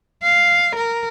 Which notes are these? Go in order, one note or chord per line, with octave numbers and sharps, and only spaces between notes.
F5
A#4